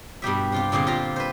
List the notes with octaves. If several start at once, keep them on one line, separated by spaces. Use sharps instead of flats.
G2 B2 G4 E5
C3 F4 G4
A#2 D3 C4 G#4 F5
F4 G4 C5 A#5
B4 C5